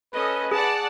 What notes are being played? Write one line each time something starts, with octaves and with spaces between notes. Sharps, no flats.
C#4 A4 B4 D#5
G#4 D5 F#5 A5